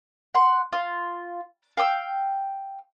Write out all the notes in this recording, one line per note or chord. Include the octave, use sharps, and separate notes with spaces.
F#5 C6
F4
F5 G5 D#6 E6